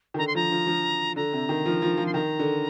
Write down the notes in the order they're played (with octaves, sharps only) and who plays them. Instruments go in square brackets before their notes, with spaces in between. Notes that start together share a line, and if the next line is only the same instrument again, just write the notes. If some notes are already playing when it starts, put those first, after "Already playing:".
[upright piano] D#3
[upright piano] D3 [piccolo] A#5
[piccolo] C6
[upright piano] F3 [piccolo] A#5
[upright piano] F3
F3
[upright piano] D3 [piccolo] A#5
[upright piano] C3
D#3
F3
F3
F3
[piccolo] C6
[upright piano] D#3 [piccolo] A#5
[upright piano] D3